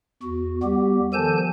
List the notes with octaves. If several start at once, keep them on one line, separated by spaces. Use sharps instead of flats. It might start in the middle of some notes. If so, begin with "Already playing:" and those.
E2 F#4
G3 B3 G4
D#3 F3 A4 G#5 A5 G6